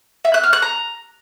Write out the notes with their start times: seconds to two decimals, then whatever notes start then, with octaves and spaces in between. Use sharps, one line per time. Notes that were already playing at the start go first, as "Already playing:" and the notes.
0.25 E5
0.34 F#6
0.43 F6
0.53 F#6
0.62 A#5